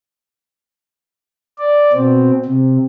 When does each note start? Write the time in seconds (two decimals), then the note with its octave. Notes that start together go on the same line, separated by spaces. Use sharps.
1.58 D5
1.93 B2 C4
2.46 C3